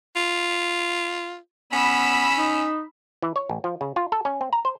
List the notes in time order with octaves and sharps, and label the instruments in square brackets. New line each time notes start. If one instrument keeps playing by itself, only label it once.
[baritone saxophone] F4
[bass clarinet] B3 [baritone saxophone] C#4 [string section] B5 E6
[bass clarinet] D#4
[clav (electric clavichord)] E3
C#5
A1
F3
C#3
F4
A4
C#4
C4
A#5
C5